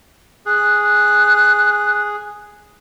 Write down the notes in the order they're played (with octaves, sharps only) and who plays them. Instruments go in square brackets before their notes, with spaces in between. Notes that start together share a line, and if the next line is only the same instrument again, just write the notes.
[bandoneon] G#4 [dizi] F#6